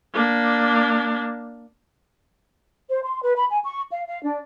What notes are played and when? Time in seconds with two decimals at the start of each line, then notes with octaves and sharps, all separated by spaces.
0.14 A#3 D4
2.90 C5
3.04 C6
3.23 B4
3.36 B5
3.50 G#5
3.64 C#6
3.91 F5
4.07 F5
4.23 D4